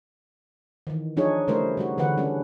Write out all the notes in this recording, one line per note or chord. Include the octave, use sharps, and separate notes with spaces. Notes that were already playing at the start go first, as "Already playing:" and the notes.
D#3 E3
F3 D4 D#4 G#4 C#5
C#3 G3 A3 E4 A#4 C5
C#3 G3 F#4
D3 E3 F#4 B4 F#5
G3 C#4 D4